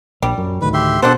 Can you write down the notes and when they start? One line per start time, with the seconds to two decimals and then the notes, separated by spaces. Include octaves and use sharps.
0.22 A#1 G3
0.38 F#2
0.62 D2 A2 D#3 B4
0.74 G4 E5 C6
1.02 B2 D4 G#4 A4 C5 F#5 A5